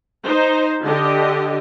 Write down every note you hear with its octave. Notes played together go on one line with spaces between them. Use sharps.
D#4 C5
D3 G4 D#5